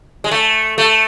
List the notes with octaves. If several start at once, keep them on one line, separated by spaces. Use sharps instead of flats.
G#3
A3
A3